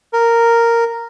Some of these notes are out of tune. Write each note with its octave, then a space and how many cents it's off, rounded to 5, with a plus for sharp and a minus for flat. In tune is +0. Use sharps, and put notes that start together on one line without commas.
A#4 -5